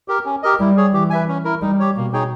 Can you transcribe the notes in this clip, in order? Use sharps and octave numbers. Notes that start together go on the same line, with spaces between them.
G4 A#4
C#4
G4 A#4 D#5
G3 E4
G#4 C#5
E3 G4
B4 E5 G#5
C#4
E4 A#4
G3 D#4
G4 C#5
B2 A#3
D#4 G#4 C#5 G5